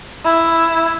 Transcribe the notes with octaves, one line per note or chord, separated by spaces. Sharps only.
E4